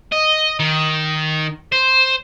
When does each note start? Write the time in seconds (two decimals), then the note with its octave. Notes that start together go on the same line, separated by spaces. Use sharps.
0.12 D#5
0.59 D#3
1.72 C5